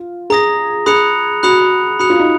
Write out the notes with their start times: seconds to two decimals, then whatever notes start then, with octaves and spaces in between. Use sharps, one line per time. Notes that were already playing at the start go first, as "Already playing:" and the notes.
Already playing: F4
0.30 G#4 A#5 D#6 A#6
0.86 G#4 B5 D#6 F#6 C#7 F7
1.43 F#4 B5 D#6 F#6 C#7 F7
1.99 F#4 B5 D#6 F#6 C#7 F7
2.10 F4
2.19 D#4